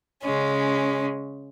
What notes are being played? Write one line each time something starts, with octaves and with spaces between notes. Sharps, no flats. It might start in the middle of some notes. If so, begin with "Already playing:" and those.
C#3 G#3 C#4